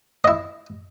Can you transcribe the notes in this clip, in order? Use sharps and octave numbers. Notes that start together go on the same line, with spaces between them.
E4 D#5